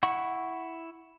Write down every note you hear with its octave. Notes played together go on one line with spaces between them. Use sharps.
E4 F#5 C#6